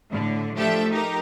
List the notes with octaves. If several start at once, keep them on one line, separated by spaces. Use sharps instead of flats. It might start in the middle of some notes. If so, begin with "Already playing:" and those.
A2 D3
F3 A3 D4 G4 A4 E5
D#4 G4 A#4